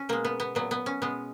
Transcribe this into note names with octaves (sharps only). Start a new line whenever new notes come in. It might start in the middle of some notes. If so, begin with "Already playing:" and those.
Already playing: C#4
B2 G#3 A#3
B3
B3
A#2 F#3 B3
B3
C#4
B2 G#3 B3